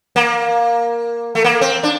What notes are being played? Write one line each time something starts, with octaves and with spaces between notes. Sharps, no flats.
A#3
A3
A#3
C4
D4